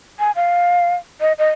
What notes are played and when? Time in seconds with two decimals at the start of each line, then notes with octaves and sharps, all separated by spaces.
0.19 G#5
0.36 F5
1.21 D#5
1.39 D#5